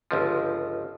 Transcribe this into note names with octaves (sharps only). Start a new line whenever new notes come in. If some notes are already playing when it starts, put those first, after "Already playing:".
G1 C#2 F3